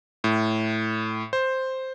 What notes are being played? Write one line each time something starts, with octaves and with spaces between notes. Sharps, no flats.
A2
C5